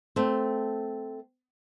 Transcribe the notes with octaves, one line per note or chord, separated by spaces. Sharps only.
A3 C4